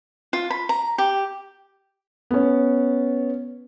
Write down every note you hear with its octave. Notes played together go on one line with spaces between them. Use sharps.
F4
B5
A#5
G4
B3 C#4